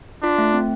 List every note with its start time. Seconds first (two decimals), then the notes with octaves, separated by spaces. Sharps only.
0.23 D4 F4
0.38 A3
0.53 C4